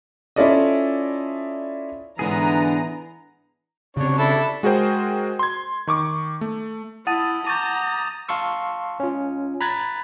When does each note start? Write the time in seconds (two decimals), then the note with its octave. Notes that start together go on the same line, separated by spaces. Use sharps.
0.36 C#4 E4 F4 A4 D5 D#5
2.19 G#2 D3 E3 B3 D4 G#4 A#5
3.97 C#3 C4 D4 C#5
4.18 D4 E4 A4
4.63 G#3 F#4 G#4 A#4 C5 G5
5.39 C6 G#6
5.87 D#3 C#6 D6
6.41 A3
7.07 E4 F#5 A5 D#6 A6 D#7
7.47 A#5 C#6 D6 G6 A6 D#7
8.28 F5 A5 C6 C#6 E6
9.00 C#4 F4
9.61 A#5 B5 F#6 G#6 A6 B6